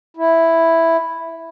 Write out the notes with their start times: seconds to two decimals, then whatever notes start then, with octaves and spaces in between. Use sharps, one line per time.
0.17 E4